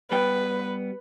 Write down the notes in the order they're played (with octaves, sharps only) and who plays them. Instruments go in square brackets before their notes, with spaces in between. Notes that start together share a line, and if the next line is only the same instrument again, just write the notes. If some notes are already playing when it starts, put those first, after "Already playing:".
[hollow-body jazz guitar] G3 B3 G5 [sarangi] B4